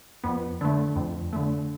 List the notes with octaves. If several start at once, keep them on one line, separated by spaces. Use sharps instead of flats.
F2 B3
D3 A3
F2
D3 A3